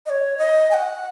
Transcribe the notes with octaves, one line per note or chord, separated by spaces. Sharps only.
D#5
C#5
D#5
G#5
F#5